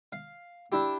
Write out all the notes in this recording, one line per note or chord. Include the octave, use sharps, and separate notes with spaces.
F5
D4 E4 G4